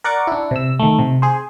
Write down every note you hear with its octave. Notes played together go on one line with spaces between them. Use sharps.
A#4 D5 F#5 C#6 D6
D4 E4
C3 E6
D#3 A3
C3
G#4 C5